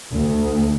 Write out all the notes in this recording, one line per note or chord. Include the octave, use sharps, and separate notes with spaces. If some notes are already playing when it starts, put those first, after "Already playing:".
D2